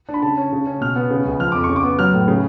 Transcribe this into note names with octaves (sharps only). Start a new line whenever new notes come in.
D4
B5
C#3 A5
C#4
C#3
C#4
B2 F6
B3
C#3
C#2
F3 F6
F2 D6
C#6
C#3
D6
B3
F#3 F6
A2
C#3